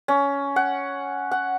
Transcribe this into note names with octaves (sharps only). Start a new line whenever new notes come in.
C#4
F#5
F#5